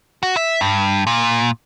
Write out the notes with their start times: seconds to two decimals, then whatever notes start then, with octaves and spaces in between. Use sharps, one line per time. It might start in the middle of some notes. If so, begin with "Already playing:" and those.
0.23 F#4
0.36 E5
0.61 G2
1.07 A#2